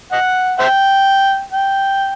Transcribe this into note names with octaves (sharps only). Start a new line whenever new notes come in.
D#5 F#5
C5 E5 G5
G5